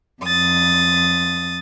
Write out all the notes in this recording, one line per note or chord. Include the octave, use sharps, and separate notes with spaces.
F2 D#6 A6